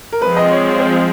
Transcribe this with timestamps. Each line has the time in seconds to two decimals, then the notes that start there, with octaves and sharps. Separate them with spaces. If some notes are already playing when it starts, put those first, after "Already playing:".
0.12 A#4
0.22 F3 G#3 C4 B4
0.37 D#5
0.51 C#5
0.79 C5